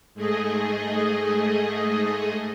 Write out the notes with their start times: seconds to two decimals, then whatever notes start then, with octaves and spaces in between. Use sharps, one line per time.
0.14 G#2 A3 G#4 D#5